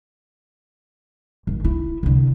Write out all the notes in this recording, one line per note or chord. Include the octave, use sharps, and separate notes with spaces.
G#1
E4
C2 D3